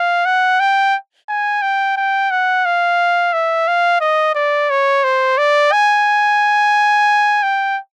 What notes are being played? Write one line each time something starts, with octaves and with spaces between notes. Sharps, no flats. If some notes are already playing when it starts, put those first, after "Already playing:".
Already playing: F5
F#5
G5
G#5
G5
G5
F#5
F5
E5
F5
D#5
D5
C#5
C5
D5
G#5
G5